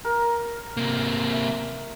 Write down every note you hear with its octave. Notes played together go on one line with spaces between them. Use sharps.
A#4
C3 A#3
E5